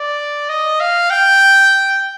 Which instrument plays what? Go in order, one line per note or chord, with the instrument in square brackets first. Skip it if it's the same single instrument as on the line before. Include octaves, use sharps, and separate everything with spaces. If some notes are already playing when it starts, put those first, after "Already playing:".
Already playing: [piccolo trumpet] D5
D#5
F5
G5